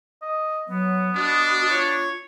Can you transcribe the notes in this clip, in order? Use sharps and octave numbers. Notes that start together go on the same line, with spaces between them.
D#5
F#3 B3
D4 F#4 D#5
F4 C#5